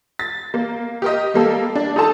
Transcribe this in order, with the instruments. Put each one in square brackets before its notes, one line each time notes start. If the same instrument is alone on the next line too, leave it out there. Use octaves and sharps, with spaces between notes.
[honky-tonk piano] A6
A#3
G4 A#4 D#5
G3 A#3 A4
D4
D#4 A4 A5